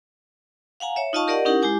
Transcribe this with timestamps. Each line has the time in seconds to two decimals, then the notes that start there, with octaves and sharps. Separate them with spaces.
0.80 F5 F#5 G#5 A#5
0.96 C#5 E5
1.13 D#4 F4 D#5 F5 A5 C#6
1.27 G4 A#4 D5 D#5 F#5
1.45 C#4 D#4 E4 G4 A#4 F#5
1.62 G#3 E4 G4 G#5 D6